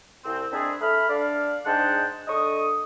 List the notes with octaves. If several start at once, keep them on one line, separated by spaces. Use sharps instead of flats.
C2 C4
G#3 C4 D4 E4 G#4
A3 B5 F6
D4 D5 F5
G#2 G#3 D4 F#5 G5 A5
D3 D#5 C#6 D#6